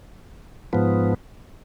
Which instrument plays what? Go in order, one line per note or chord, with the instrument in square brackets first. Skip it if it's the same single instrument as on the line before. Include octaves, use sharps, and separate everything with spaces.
[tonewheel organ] G#2 F3 B3